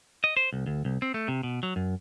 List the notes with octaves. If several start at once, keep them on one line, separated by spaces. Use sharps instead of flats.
D#5
C5
C2
D2
C2
C4
A3
C3
B2
F#3
F#2